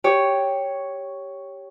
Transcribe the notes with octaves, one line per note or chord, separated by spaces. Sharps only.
G4 C#5